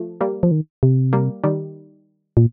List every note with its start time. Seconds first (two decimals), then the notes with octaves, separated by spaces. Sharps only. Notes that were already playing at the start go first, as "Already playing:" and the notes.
Already playing: F3 A3
0.21 G3 A#3
0.43 F3
0.51 D#3
0.83 C3
1.13 G3 A#3
1.44 D#3 G3
2.37 A#2